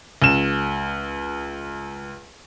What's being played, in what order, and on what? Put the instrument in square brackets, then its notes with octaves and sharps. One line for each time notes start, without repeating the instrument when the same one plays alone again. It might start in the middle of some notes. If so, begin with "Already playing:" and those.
[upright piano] C#2 E7